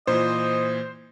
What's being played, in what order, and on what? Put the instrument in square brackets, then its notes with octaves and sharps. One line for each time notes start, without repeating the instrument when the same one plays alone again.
[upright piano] A#2 E3 [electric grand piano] C5 [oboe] D#5